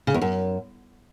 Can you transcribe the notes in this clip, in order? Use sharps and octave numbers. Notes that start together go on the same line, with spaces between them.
C#3
E2
F#2